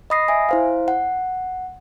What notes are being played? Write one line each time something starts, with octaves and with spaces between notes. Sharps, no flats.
D#5 B5 D#6 A#6 C7
E5 G#5
E4 C5 F5
F#5